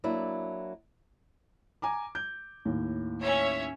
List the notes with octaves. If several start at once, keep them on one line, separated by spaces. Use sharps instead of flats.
F#3 A#3 D4 E4
G#5 A#5 D6
G6
D#2 A2
C#4 C#5 E5